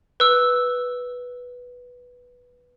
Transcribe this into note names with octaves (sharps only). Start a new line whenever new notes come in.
B4 E6